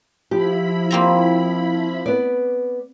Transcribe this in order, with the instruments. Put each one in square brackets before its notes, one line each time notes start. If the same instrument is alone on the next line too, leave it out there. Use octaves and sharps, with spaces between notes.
[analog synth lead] F3 [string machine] E4 B5 [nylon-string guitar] G4
[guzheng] A#3 C4 A#5
[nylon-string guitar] B3 D5